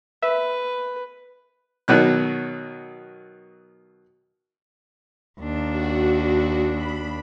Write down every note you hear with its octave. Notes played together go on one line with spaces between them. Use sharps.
B4 E5
B2 D#3 F#3 F#6
D#2 D4
F#4
B5